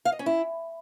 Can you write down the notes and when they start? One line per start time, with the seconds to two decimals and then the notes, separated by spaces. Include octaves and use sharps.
0.05 F5
0.12 D#5
0.19 C#4
0.26 E4